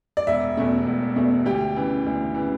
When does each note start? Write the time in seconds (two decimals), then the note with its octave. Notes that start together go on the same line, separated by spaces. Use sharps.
0.17 D5
0.27 E1 E5
0.57 E2 B2 A3
0.87 E1
1.16 E2 B2 A3
1.46 D2 G4
1.76 C#3 E3
2.06 D2
2.35 C#3 E3